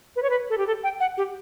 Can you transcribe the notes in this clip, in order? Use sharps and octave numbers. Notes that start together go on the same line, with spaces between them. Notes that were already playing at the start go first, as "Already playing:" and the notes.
B4
C#5
B4
A4
G4
A4
G5
F#5
G4